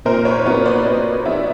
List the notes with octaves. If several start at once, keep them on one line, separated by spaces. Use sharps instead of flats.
A#2 A#4 C5
B4 C#5
F#3 B3 B4 C#5
C5 D5
A#2 C#5 D#5
F#3 B3 D5 E5